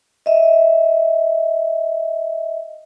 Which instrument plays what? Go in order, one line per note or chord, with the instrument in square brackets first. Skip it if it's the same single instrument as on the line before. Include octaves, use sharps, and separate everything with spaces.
[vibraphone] D#5 E5